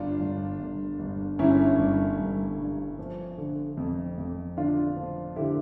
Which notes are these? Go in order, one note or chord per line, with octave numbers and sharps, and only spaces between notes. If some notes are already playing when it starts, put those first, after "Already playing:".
Already playing: G1 D4 F4
G1
G1
G1
G1 C#4 E4
G1
G1
G2
F3
D3
F2
F2
D3 D4 F4
F3
D3 E4 G4